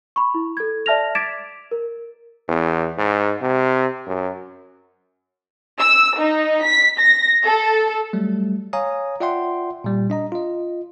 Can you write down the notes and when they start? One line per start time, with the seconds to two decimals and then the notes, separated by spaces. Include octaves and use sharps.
0.16 B5 C#6
0.34 E4
0.57 A4 G#6
0.86 D5 E5 A5 F6 A#6 F7
1.15 D6 G#6 A6 B6 D7 E7
1.71 A#4
2.48 E2
2.98 G#2
3.41 C3
4.07 F#2
5.80 E6
6.19 D#4
6.66 B6
7.00 A#6
7.46 A4
8.13 F#3 G3 A3
8.73 C#5 F5 G#5 A#5 D#6
9.20 F4 D5 E5 F#5 G5 C6
9.84 A#2 G3
10.10 D4 D#5 A#5
10.32 F4 D#5